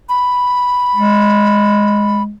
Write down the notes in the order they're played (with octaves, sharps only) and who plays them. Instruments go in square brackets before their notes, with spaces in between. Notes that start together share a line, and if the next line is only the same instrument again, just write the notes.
[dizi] B5
[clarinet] G#3